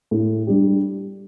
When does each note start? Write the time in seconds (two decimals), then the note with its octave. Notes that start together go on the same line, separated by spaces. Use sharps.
0.11 A2
0.47 G3 D4 G4